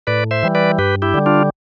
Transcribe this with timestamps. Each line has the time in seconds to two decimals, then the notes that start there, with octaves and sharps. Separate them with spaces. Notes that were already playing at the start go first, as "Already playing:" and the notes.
0.07 A2 B4 D5
0.31 C5 E5
0.43 E3 G3
0.55 B4 D5
0.78 G2 G4 B4
1.02 E4 G4
1.14 D3 G3
1.26 D4 F4